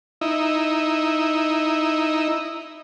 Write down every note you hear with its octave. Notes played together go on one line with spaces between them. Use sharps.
D#4 E4